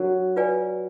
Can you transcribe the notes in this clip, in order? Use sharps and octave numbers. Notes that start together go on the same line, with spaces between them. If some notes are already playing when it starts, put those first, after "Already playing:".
Already playing: F#3 D4 F#4 A#4
F4 B4 D5 G#5